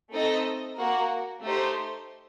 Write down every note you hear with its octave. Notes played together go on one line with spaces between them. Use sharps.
A3 C4 D#4 A4 D#5
A#3 F#4 A#4
A3 D#4 G4 C5